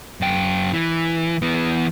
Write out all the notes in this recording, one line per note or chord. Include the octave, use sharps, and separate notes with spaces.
F#2 G5
E3
E3 B3